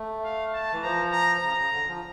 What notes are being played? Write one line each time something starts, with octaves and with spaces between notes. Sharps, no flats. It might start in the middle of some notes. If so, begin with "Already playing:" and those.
Already playing: A3
F5
A5
E3
F3 A#5
A#5
C#3 A#5
C#3
D3
F3